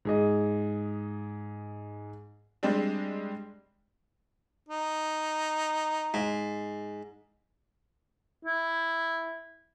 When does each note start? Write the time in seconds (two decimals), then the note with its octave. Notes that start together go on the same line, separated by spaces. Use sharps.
0.05 G#2 G#4 D#5
2.63 G3 G#3 C4 D4
4.69 D#4
6.14 G#2
8.45 E4